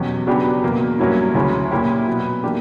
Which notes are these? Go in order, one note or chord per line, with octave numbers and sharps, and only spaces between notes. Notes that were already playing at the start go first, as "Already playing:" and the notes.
Already playing: E2 B2 F#3 C#4 G4
C#3 F#3 B3 D4 G4
E2 B2 A#3
G2 F#3 A#3 C#4 E4
D2 C#3 F#3 C#4 E4
A#2 A#3 C#4 E4 G4
B2 F#3 B3
E3 A#3 D4 G4